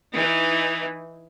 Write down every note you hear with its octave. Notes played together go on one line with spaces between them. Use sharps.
E3 D#4